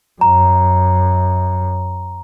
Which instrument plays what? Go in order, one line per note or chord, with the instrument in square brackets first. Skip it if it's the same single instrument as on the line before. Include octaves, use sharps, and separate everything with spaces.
[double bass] F#2 [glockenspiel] A#5